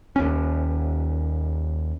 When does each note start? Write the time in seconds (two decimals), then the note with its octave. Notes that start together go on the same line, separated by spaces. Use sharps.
0.16 D#2 C#4